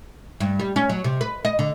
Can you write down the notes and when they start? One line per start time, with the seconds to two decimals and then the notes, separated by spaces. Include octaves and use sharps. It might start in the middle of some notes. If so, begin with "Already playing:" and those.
0.40 G2
0.60 G3
0.76 C#4
0.89 F#3
1.04 C3
1.21 B4
1.45 D#5
1.59 D3